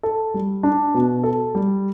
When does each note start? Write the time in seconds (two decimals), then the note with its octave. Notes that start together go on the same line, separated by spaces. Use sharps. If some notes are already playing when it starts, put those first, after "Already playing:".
0.03 A4
0.34 G3
0.63 D4
0.94 B2
1.24 A4
1.55 G3